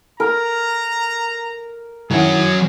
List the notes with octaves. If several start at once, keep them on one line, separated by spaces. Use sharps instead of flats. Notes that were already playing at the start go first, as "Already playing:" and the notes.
A#4 A#5
D#3 F#3 C#4 E4 G#4 F#5